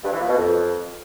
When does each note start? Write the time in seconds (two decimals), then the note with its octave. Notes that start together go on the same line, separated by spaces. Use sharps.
0.04 G2
0.12 E3
0.20 A#2
0.28 B2
0.37 F2